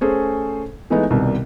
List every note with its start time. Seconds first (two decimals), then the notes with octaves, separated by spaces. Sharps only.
0.01 A3 C#4 G#4 A4 C5
0.90 E3 G#3 A3 B3 D#4
1.10 C2 B2 D#3 G3